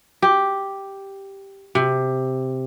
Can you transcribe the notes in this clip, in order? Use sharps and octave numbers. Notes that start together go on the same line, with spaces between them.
G4
C3